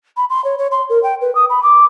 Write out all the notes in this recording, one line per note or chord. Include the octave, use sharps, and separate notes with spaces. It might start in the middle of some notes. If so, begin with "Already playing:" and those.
B5
C6
C#5
C#5
C6
A#4
G5
B4
D#6
B5
D6